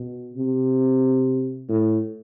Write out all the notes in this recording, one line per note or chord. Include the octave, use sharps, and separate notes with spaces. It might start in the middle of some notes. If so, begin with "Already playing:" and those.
Already playing: B2
C3
A2